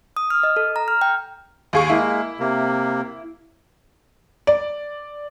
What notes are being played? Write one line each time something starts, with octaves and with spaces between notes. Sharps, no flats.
D#6
F6
D#5
A4
A#5
F6
G5
D#2 G#4 C#6
G#3 A#3 E4
C3 A#3
D5